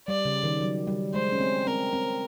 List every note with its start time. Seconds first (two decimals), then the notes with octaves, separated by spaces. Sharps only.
0.08 G3 D5
0.25 C#3
0.44 D#3
0.61 F#3
0.87 G3
1.14 G#3 C5
1.32 C#4
1.40 C4
1.67 C4 A#4
1.93 C4